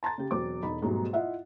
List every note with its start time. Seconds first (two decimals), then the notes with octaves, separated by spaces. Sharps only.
0.03 A5 A#5 C6 A6
0.18 C#3 G4
0.31 E1 F#3 C4 D6
0.62 E1 D#4 B5
0.82 G#2 B2 F#3 G3 A3
1.13 E4 F4 D#5 E5 F#5